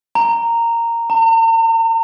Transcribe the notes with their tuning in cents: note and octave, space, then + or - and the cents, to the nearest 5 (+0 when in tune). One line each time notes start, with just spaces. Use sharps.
A#5 -10
A#5 -45